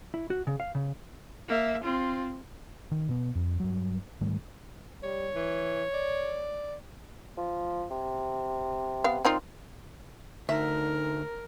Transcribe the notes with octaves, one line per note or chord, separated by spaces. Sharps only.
E4
F#4
C#3
F5
C#3
A#3 E5
C4 F4
D#3
B2 B3
F2
G2 F#3
G#2 D#3 G3 A3
G3 C#5
E3
D5
F3
C3
B3 F5
A#2 C4 D#4 F4
D2 D#4 A#4 E5